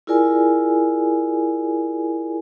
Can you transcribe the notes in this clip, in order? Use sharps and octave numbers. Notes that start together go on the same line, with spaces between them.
E4 F4 G#4 A#4 D5 G#5